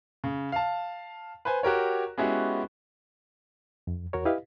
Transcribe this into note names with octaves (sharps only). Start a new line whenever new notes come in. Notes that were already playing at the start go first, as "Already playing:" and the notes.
C#3
F5 A5
B4 C5 G#5
F#4 G4 A#4 C#5
G#3 B3 C#4 E4 F#4 G4
F2
E2 F#4 A#4 C#5
E4 G4 B4 D#5 F5